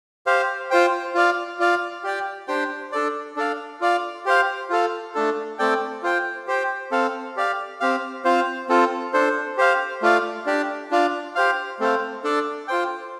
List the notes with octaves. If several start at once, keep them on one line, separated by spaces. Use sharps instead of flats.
G4 C5 F5
F4 C5 G5
F4 D5 F5
F4 D5 F5
G4 D5 G5
D4 G4 C5 G5
D4 A4 D5
D4 A4 D5 F5
F4 D5 F5
G4 C5 F5
F4 A4 F5
A3 D4 A4
A3 C4 A4 D5 G5
F4 C5 G5
G4 C5 G5
C4 A4 F5
G4 D5 F5
C4 G4 F5
C4 F4 C5 F5
C4 F4 A4
D4 A4 C5
G4 C5 F5
A3 F4 D5 F5
D4 G4 D5
D4 F4 D5 F5
G4 C5 F5
A3 C4 A4 C5 F5
D4 A4 D5
F4 C5 G5